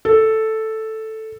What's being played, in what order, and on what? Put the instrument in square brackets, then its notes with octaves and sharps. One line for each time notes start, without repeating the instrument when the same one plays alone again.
[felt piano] A4